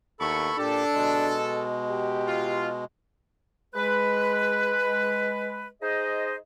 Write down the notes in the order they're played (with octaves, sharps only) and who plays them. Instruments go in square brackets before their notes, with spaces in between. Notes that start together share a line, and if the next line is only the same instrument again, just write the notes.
[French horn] D#2 [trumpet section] B3 E4 C#6 [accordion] A4 B5
[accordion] A#2 G4 [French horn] D4 [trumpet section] A4
[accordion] B2 G#3
[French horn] G4
[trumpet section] F4
[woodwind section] G#3 B4
D#4 G#4 C5 D#5